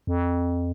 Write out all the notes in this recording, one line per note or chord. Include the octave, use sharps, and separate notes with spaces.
F2